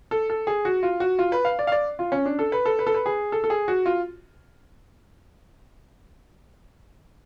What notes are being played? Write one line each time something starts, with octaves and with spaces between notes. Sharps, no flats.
A4
A4
G#4
F#4
F4
F#4
F4
B4
F5
D5
F5
D5
F4
C#4
D4
A4
B4
A4
B4
A4
B4
G#4
A4
A4
G#4
F#4
F4